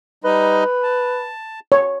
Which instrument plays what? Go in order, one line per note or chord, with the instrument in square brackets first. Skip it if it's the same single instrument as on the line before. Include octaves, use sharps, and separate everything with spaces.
[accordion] G3 D#4 D#5 [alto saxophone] B4
[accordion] A5
[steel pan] C#5